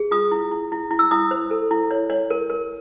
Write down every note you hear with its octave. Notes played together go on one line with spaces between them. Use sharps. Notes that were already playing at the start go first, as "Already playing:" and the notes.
Already playing: G#4
F4 D#6
E4
E4
E4
E4
E6
E4 D#6
C5
A4
E4
C#5
C#5
A#4
A#4